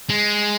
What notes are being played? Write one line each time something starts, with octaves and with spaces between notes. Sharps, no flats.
G#3